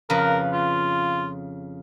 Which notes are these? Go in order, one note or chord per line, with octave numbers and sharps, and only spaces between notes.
F2 C#3 A#4 B4
F4